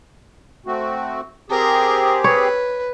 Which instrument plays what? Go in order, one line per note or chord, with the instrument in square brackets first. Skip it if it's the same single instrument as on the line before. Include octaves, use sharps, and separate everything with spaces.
[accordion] A3 C4 F#4
[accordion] C4 G4 G#4 [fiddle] A#4
[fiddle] B4 [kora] C#5